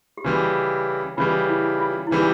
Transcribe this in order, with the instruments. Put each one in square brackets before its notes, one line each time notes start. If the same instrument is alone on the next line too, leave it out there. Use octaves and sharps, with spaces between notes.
[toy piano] G4
[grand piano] C#3 E3 G3 [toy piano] F#4
[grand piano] C#3 E3 G3 [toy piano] F4
[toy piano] E4
F4
E4
[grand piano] C#3 E3 G3 [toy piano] D#4